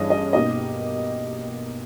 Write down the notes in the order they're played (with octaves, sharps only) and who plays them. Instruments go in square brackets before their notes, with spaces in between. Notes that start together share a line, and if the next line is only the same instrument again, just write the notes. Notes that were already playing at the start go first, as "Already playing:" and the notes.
Already playing: [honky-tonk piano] G2 E3 G3 C#4 G#4 [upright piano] D#5
[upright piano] D#5
[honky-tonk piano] B2 A#3 D#4 G4 [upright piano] D#5